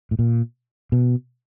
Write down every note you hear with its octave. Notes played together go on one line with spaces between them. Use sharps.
A2
A#2
B2